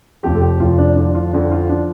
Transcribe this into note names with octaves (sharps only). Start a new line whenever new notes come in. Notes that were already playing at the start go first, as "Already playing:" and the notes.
F1 F2 F3 G4
A4
G4
F1 F2 F3 F4
D4
F2 D3 F3 D4
F4
F2 D3 F3 D4
F4
F3 D4